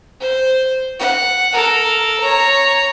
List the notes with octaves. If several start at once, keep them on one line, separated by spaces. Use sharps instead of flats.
C5
F#5
A4 A#4
C#5 A#5